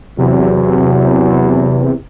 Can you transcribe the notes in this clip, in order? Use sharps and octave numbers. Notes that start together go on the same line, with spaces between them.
E2 C3 F#3